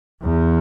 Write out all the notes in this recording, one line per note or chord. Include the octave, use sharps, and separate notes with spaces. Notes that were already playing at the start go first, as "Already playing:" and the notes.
E2